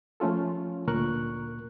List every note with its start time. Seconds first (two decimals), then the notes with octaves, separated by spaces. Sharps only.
0.20 F3 A3 C#4 F4 A4
0.87 D2 A#2 A#4 C#6 F#6